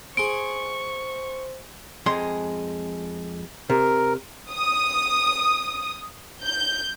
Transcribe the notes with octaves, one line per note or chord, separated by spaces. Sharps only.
G#4 C5 C6 C#6 D7
F2 G#3 C6
C3 A#4
D#6
G6